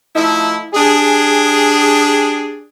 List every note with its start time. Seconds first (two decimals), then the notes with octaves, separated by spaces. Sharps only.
0.15 F3 A3 D#4 E4
0.73 D4 G4 G#4